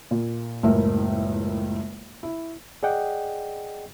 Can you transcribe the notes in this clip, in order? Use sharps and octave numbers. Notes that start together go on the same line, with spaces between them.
A#2
F#1 C#2 A2 E4 A#4 E5
E4
G#4 D5 D#5 F#5 G5